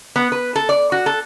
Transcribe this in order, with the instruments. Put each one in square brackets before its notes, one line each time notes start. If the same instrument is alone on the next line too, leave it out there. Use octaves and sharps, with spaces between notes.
[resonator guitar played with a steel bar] B3
B4
A4
D5
F#4
A4